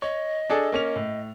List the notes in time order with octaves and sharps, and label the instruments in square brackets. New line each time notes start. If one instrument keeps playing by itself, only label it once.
[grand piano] C#5 [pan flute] D#5
[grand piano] D4 G#4 A4
A#3 C#4 F7
A2